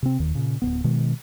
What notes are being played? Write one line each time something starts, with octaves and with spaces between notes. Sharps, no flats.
C3 C4
E1 D#2 D#3
A#2 C#3
D1 B1 B3
B2 D#3 G#3